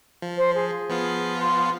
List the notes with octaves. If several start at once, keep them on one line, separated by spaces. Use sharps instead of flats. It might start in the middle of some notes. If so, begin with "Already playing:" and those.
F3
C5
G#4
F3 B3 F4
C6